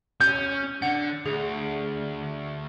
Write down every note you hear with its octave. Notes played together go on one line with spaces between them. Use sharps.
C#4 G6
D3 F#5
D2 G#4